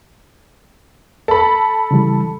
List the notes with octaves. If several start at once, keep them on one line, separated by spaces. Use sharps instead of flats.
A4 B5
C#3 E3 G3